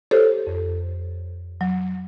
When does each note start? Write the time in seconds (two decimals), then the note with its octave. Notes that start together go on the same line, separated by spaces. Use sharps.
0.11 G4 A4 C5 C#5
0.47 F2
1.61 F#3